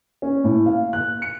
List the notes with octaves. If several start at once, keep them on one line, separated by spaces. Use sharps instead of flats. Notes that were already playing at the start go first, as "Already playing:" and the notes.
C#4
A2
F5
F#6
C#7